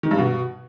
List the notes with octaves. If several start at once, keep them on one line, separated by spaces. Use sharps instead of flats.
D#3
G2
B2